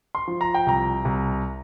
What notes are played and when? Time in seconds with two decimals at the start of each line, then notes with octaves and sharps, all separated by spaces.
0.15 C6
0.28 F3
0.41 A#5
0.54 G5
0.66 C2 A#5
1.05 C2